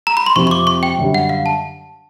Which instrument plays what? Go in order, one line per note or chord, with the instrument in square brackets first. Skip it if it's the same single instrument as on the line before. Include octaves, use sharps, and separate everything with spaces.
[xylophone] A#5
B5
C6
[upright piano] F2 C3 F3 [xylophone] C#6
[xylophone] C#6
D6
C#6
G5
[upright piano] F#2 D3 G3
[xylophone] F#5
F5
A5